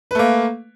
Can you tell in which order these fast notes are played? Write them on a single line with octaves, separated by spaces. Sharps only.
B4 A3 A#3